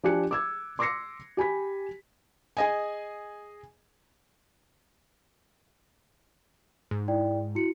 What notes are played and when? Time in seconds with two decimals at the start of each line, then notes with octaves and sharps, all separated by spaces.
0.03 F3 D4 G4 G#5 F#6 C#7
0.31 D6 E6 G#6
0.79 C6 D6 E6 A#6 C7 C#7
1.37 G4 G#5 B5 B6
2.57 G#4 D#5 G#5
6.91 G#2
7.08 E4 D5 G5
7.55 E4 F#4 C#7